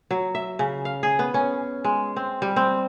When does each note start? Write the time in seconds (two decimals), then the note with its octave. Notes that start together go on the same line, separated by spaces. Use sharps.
0.11 F#3
0.35 E5
0.59 C#3
0.85 F5
1.03 G#4
1.19 B3
1.34 C#4
1.84 G#3
2.16 C4
2.42 G3
2.56 C4